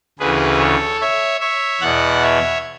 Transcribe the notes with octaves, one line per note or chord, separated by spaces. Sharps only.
D2 C#3 E3 G#4 B4
A4 C#5
C#5 E5
C#5 E5
E2 B2 D5 F#5
C#5 E5